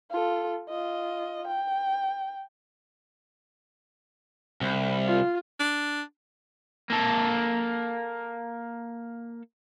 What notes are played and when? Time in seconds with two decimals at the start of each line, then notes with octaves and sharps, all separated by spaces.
0.11 F4 A4
0.69 F4 D#5
1.47 G5
4.61 C2
5.05 F4
5.60 D4
6.90 A#3 A4